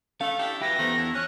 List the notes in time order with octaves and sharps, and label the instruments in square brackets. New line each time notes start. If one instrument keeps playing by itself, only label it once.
[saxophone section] A3 [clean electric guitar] C#4 F5
[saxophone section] D4 E4 G4
[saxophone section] F#2 E3 [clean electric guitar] E4 G4 [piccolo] A#6
[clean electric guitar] E2 [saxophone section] D#3 F3 A3
[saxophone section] D4 E4
[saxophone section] C#4 [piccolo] F#6